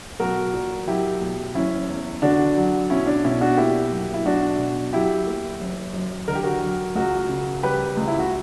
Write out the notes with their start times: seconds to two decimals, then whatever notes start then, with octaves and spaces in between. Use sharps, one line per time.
0.20 B1 F#4 A#4
0.53 A#2
0.87 F#3 E4 G4
1.21 B1
1.55 F#1 C#4 E4
1.88 E2
2.22 D3 D4 F#4
2.57 F#3
2.90 B1 C#4 E4
3.07 D4
3.24 B2 C#4 E4
3.41 D4 F#4
3.57 A#3 E4 G4
3.92 B1
4.14 E4
4.25 B1 D4 F#4
4.58 B2
4.93 F#3 E4 G4
5.27 A#3
5.61 F#1
5.94 F#2
6.28 D3 A#4
6.35 G4
6.44 F#4 A#4
6.61 F#3
6.95 C#2 F#4 A#4
7.29 C#3
7.63 G3 G4 B4
7.97 C#2
8.08 E4
8.19 F#4